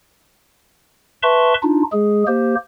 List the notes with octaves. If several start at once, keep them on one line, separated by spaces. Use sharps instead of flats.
B4 E5 A5 C6 C#6
D4 D#4 F4
G#3 G#4
A#3 G4 C5